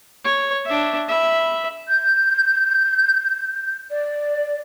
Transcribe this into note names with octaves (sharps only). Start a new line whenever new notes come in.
C#5
D4 E5
E5 B5
G6
D5